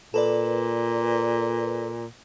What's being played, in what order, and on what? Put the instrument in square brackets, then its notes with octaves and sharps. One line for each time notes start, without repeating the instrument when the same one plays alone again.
[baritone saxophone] A#2 [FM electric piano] A4 B4 D5